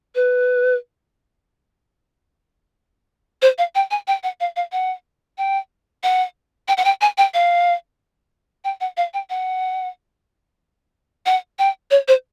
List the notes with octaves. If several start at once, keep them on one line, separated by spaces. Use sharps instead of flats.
B4
C5
F5
G5
G#5
G5
F#5
F5
F5
F#5
G5
F#5
G5
F#5
G5
G#5
G5
F5
G5
F#5
F5
G5
F#5
F#5
G5
C#5
C5